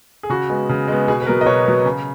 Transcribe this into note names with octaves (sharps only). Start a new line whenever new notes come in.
G#4
C#3 F#4
G#3 B3
C#3
G#3 B3
B2 G#4
B4
F#3 B3 A#4
D#5
B2 C#5
F#3 B3
C#3